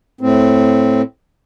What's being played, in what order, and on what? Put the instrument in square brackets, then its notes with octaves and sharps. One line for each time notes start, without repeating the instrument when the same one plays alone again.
[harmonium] A2 C4